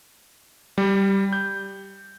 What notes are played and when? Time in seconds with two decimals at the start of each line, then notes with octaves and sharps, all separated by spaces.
0.78 G3
1.33 G6